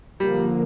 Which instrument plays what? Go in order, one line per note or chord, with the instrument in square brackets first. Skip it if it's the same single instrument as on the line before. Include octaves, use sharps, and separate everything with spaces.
[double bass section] D3 F3 A#3 [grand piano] G3